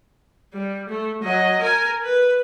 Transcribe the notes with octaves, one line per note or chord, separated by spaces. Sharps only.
G3
A3
F#3 D#5
A#4 G#5
B4